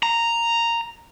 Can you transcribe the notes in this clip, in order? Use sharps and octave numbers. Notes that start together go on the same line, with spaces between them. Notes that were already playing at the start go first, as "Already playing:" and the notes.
A#5